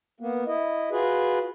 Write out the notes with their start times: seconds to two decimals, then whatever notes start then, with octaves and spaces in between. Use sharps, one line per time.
0.20 A#3 B3
0.47 E4 D#5
0.91 F4 F#4 G#4 B4